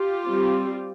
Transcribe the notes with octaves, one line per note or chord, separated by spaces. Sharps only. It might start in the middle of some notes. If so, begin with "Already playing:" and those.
Already playing: F4 G4
G3 C4